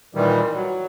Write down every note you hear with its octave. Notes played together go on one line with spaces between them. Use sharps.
A#2 D#3 E3 G3
F#3